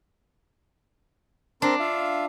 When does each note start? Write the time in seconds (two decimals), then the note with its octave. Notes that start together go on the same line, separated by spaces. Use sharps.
1.62 C4 D4 A#4 C6
1.79 F4 E5 F5